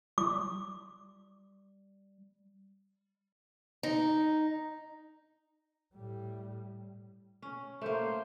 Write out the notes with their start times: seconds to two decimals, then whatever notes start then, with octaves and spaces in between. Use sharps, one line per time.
0.18 G3 D6
3.83 D#4
5.95 A2 G3
7.42 C#4
7.82 A3 A#3 C5